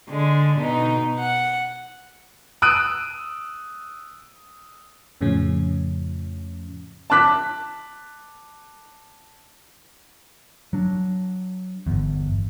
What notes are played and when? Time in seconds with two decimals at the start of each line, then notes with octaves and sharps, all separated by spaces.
0.10 D3 G#3
0.58 B2 D#4
1.19 F#5
2.62 D#6 E6 F#6 D7 D#7
5.21 F2 A2 C#3 F3 C#4
7.10 A5 D6 F#6 B6
10.73 F#3 D4
11.87 G1 E2